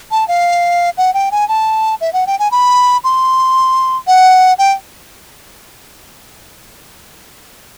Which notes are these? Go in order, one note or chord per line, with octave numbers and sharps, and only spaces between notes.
A5
F5
F#5
G5
G#5
A5
E5
F#5
G5
G#5
B5
C6
F#5
G5